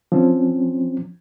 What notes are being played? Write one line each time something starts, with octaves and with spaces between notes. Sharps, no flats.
F3 C4 C#4